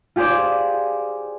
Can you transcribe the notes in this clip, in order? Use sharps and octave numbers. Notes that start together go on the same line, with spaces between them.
F4 G4 G#4 C5 D5